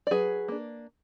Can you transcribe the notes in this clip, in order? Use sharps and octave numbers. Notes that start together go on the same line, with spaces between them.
D5
F#3 G#4 B4
A#3 D4